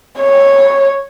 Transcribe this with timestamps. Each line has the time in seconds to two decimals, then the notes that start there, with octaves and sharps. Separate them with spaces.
0.20 C#5